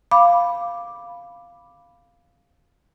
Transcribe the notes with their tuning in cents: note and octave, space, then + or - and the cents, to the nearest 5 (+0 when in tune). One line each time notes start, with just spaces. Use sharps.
F5 +0 B5 +0 D6 +0